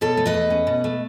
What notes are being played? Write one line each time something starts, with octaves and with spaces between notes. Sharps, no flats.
B2 A4 C#5
A3
B4 D#5
E2
C#4
B2
A3